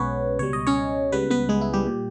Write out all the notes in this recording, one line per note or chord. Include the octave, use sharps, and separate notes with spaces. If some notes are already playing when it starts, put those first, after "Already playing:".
Already playing: B1 B2 G#3 B3 C#4 B4 C#5
C#2 B2 G3 C#5
D#5
C#4 C#5
C#2 C#3 G3 B3 B4
B3 B4
G#3 G#4
E4
G3 G4
A#2 G3